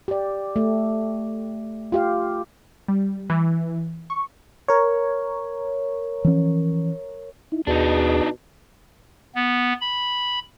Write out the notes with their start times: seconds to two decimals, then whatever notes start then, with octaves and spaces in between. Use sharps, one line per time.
0.08 G4 D5
0.56 A3
1.92 F4 G4 F5
2.88 G3
3.30 E3
4.10 C#6
4.68 A#4 C#5
6.25 E3 F3 C#4
7.52 D#4 E4
7.67 D#2 B2 D4 D#4 G#4
9.35 B3
9.81 B5